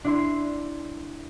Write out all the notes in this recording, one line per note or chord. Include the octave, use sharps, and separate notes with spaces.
D4 E4 C6